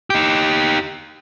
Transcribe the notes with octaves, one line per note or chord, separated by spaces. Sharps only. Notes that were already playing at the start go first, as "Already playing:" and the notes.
D#4 G4